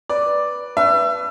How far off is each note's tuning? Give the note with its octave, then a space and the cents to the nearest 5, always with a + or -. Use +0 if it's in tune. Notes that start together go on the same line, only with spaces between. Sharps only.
B4 -5 D5 +0
D4 -10 B4 +0 E5 +30